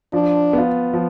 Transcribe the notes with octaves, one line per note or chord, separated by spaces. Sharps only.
F3 D4
B3 F4
F3